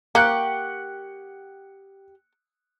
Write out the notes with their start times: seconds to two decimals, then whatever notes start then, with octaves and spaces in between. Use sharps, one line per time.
0.15 A#3 G4 F#5 C#6 F#6 C#7